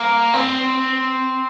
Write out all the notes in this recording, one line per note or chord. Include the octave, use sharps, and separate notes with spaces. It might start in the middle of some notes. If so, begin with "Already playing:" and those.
Already playing: A#3
C4